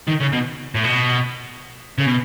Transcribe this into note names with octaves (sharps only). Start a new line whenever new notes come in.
D#3
C#3
B2
A2
B2
C#3
B2